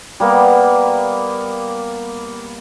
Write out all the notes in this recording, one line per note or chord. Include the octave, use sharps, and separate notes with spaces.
G3 A#3 B3